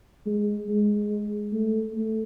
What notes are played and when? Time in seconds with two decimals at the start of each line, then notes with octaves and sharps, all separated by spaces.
0.26 G#3
0.69 G#3
1.53 A3
1.94 A3